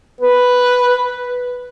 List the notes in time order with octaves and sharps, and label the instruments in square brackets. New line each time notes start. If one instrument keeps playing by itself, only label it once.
[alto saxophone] B4